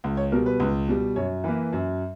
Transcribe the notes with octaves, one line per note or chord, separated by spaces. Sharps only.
C#2
C#5
B2 G3 A#4
B4
C#2
B2 G3
F#2 C#5
E3 A#3 B4
F#2